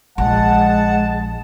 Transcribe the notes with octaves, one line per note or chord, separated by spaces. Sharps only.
A#1 G#3 F#5 A5